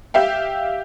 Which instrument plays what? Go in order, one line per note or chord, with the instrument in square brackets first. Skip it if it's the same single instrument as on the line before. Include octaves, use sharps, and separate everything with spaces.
[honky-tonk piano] G4 E5 F5 G5